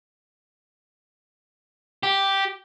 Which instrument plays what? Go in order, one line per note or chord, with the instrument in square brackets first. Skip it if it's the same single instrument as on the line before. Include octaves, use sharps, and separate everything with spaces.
[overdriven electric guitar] G4